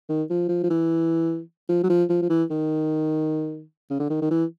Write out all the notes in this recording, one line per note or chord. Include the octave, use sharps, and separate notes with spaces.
D#3
F3
F3
F3
E3
F3
F#3
F3
F3
F3
E3
D#3
C#3
D3
D#3
D#3
E3